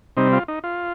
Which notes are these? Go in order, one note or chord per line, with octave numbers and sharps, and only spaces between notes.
C3 G3 C4 D#4
F4
D#4
F4